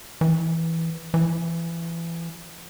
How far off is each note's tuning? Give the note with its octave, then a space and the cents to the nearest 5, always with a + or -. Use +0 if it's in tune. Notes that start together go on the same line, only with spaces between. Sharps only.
E3 -5
E3 +25